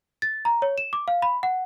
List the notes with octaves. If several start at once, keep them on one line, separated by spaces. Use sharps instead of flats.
A6
A#5
C#5
E7
D6
F5
B5
F#5